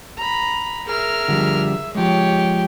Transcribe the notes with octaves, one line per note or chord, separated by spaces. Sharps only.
A#5 B5
G#4 A#4 E5 F6
D3 F3 G3
F3 G#3 G4 C#5